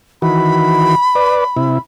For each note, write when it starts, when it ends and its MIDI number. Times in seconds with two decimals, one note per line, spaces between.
0.22 0.95 51
0.22 0.95 52
0.22 0.95 66
0.22 1.80 83
1.15 1.44 71
1.15 1.44 74
1.57 1.78 48
1.57 1.78 64